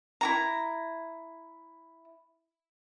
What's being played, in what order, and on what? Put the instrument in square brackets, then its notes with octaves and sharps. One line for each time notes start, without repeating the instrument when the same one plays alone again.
[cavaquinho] E4 F#4 A#5